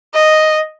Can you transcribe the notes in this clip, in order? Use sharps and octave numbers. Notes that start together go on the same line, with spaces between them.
D#5